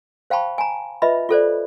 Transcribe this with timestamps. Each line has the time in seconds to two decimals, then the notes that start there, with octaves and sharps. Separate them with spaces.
0.30 C5 F5 G5 A5 B5 C#6
0.58 G#5 A#5
1.02 F4 B4 D#5 E5 B5
1.29 F4 A4 C5 D5